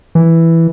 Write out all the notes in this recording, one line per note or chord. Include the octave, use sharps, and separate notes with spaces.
E3